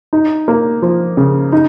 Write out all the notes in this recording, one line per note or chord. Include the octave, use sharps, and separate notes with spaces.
D#4
A#3
F3
C#3
D#4